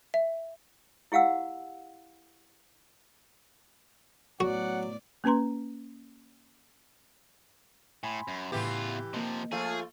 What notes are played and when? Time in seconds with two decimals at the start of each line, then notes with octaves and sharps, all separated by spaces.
0.14 E5
1.12 E4 G4 F5 F#5 E6
4.40 A2 F#3 B3 F#4 D5 F#5
5.24 A#3 C#4 B4 A#5 C6
8.03 A2 G#5 B5 C6
8.28 F#2
8.52 E2 A2 C#3 E3 F4 G4
9.14 C3 F3 A#3 D#5
9.52 F3 A3 F4 G#4